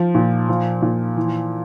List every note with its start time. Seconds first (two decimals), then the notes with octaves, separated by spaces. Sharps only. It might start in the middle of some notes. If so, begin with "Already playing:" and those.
Already playing: F3
0.15 A#2
0.49 F3
0.82 A#2
1.17 E3